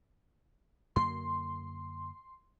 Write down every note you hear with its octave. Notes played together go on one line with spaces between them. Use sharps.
F#2 D3 A#3 C6